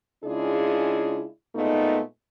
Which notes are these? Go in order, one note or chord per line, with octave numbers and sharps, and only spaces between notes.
C#3 G#3 D4 E4 F4 G#4
A#2 G#3 A3 B3 D#4